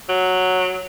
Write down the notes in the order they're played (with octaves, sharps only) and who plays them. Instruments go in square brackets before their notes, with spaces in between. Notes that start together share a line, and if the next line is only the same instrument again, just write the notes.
[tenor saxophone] F#3